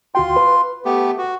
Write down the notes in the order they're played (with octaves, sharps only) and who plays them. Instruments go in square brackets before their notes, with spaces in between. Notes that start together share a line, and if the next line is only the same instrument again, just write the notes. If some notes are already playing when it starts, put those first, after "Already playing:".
[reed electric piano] D2 F#4 G5 [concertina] F4 C6
[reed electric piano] B4
[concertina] A3 B3 G4
F#4